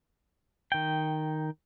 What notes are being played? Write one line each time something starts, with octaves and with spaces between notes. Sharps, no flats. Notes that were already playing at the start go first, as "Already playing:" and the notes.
D#3 G5